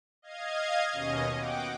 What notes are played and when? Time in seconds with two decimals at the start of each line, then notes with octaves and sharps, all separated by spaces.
0.22 D#5 F5 G#6
0.92 D#2 B2 C#4 D#5
1.37 F#5 G5 D6